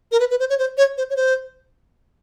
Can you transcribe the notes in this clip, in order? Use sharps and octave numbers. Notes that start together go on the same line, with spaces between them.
A#4
B4
B4
C5
C#5
C5
C#5
C5
C#5
C5